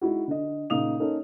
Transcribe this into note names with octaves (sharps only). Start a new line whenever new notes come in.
G#3 D#4 E4 F#4
D3 D#5
A#2 C#3 D#4 F5 D#6 F7
A#3 C#4 D#4 A4